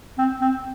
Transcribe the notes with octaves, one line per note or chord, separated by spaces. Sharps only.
C4
C4